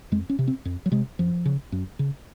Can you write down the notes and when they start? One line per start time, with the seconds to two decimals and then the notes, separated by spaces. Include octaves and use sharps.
0.12 F2 G#3
0.29 C#4
0.39 C3
0.48 C4
0.65 F2
0.86 F#3
0.92 C3 G#3
1.19 F#2 F3
1.46 C#3
1.72 F#2
1.99 C#3